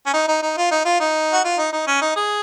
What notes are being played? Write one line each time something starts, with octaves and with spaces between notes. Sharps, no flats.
C#4
D#4
D#4
D#4
F4
D#4
F4
D#4
F#4
F4
D#4
D#4
C#4
D#4
G#4